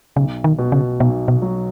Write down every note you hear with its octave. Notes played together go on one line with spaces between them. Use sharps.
B1 C#3
D#3
B2
C#3
B1 B2
B2
F#3